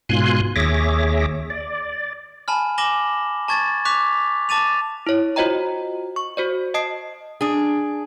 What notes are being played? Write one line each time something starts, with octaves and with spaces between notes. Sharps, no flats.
G#2 B2 F4 G#5 C6 F#6
D#2 G#4 C#5 E5 D6 A#6
D5
G#5 A5 B5 F6
G#5 D6 A#6 E7 F#7 G7
A5 C#6 G#6 A6
C#6 D6 F#6 B6 F7
A5 D6 A6 D#7 F7
E4 C#5
F4 F#4 C5 D#5 G5 A#5
C#6
F#4 C5 D5
D#5 A5 D#6 C7
D4 G#4